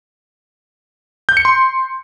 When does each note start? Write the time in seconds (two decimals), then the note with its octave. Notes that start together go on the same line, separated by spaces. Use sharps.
1.29 G6
1.37 C#7
1.45 C6